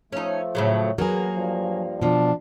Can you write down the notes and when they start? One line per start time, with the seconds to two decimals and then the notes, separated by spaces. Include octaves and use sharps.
0.13 F3 A3 C#4 D#4
0.55 A2 C#3 F#3
0.98 F#3 A#3 B3 G#4
1.35 G2 F3
2.01 B2 F3 D4